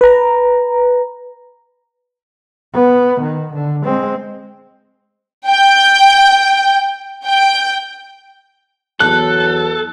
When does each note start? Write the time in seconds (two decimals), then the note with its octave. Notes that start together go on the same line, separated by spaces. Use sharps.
0.01 B4 A#5
2.74 B3
3.21 D#3
3.54 D3
3.85 G#3 C4
5.47 G5
7.25 G5
9.00 E2 F#3 A4 F#6